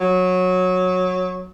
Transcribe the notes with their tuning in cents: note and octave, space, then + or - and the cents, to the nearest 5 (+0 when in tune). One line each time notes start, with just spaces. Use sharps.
F#3 -15